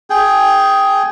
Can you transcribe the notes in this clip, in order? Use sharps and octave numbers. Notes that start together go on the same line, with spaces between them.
G#4 G5